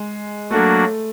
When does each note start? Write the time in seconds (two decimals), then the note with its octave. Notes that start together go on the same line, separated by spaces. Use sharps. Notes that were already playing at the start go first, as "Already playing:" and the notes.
Already playing: G#3
0.51 F#3 A3 A#3 D4 F#4